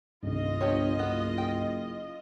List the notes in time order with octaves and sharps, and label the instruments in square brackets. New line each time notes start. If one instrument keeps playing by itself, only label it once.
[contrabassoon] D#1 [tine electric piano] C2 G2 [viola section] F4 D#5
[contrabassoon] G1 [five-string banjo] F3 G4 C#5
[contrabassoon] F#1 [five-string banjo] B3
[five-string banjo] G5